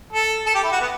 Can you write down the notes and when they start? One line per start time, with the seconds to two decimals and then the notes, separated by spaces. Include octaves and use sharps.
0.12 A4
0.46 A4
0.55 G4
0.63 E4
0.72 F#4
0.80 B3